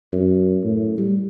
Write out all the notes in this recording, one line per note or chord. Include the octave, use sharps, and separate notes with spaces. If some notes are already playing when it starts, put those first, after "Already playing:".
F#2
A2
G3